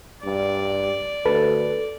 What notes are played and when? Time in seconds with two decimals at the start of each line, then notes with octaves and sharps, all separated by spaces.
0.25 G2 D5
1.26 D2 A4 B4